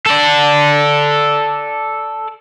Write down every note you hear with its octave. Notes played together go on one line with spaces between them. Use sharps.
A4 D5